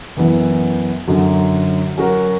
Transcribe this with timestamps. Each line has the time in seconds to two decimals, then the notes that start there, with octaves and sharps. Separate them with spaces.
0.17 F#2 E3 B3 E4
1.07 F#2 D3 F#3
1.98 F#3 C#4 F#4 A#4